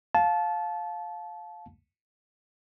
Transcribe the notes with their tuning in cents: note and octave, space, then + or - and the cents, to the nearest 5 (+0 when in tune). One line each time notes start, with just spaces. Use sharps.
F5 +10 A5 -20